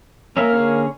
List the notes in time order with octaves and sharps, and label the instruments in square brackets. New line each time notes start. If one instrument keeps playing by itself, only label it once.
[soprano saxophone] A#3 [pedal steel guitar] C#4 A#4 E5
[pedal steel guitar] D3 C#4 G#4